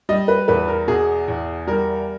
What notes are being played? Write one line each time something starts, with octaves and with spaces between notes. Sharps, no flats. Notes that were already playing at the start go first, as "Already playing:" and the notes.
G3 D#5
B4
E2 B4
A#4
B2 G#4
E2
G3 A#4